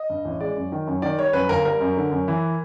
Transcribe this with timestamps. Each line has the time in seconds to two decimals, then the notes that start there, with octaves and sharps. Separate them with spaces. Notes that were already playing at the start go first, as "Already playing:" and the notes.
Already playing: D#5
0.10 G2
0.25 A1
0.40 G#3 D5
0.56 F#2
0.72 D#3
0.87 F#2
1.02 D#3 D5
1.19 G3 C#5
1.33 F#2 B4
1.49 G1 A#4
1.64 G3 A#4
1.81 F#2
1.97 D3
2.11 F#2
2.28 E3